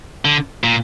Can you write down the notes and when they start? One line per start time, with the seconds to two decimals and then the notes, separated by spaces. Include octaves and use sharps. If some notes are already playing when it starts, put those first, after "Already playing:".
0.25 D3
0.64 A#2